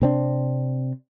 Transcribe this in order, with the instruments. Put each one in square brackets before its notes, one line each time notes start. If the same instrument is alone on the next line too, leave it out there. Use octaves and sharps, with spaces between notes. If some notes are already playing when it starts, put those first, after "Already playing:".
[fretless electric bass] C3 C4 D4